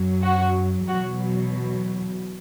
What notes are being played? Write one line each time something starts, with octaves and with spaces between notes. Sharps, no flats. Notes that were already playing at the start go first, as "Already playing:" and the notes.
Already playing: F#2 F#3
F#4
E2 B2 F#3 F#4